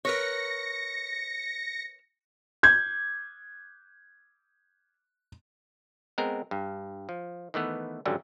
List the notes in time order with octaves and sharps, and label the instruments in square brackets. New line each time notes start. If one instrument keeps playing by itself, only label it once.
[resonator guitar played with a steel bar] A#4 B4 C#5 [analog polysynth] A#6 C#7
[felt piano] G6 G#6
[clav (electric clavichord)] G#3 B3 C4 A#4
G2
F3
D#3 E3 A3 B3
G#1 F#2 D3 F#3 G3